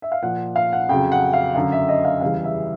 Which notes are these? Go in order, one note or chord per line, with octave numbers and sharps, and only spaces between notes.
E5
F5
A#2 F3 F#5
F5
F#5
F2 C#3 F#3 G5
F#5
F5
F#2 D3 F#3 F5
E5
D#5
F5
E2 C#3 E3 G3 F5
E5